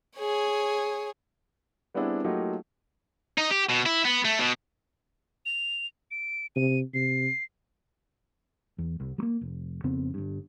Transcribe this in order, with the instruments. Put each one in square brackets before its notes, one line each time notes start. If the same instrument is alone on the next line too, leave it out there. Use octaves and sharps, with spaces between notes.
[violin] G#4 C#5
[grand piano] G3 B3 C4 D4 E4 G#4
F#3 A3 A#3 D#4 F4 G4
[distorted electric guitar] D#4
G4
B2
E4
B3
A3
B2
[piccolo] F7
D7
[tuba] C3 [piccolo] D#7
[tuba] C3 [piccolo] C7
[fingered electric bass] E2
C2
G3 A#3
F1
F2 C#3 B3 C4
G1 G2